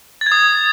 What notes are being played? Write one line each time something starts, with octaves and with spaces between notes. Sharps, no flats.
A6
G#6
D#6
G#6